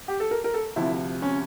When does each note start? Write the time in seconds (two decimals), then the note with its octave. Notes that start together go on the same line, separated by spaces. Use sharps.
0.08 G4
0.20 A4
0.31 A#4
0.44 A#4
0.54 A4
0.76 D2 C3 F3 E4
1.22 C#4